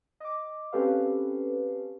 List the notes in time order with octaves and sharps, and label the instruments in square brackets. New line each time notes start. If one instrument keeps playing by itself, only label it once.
[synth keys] D#5 D6
C4 C#4 G4 A4 B4 F5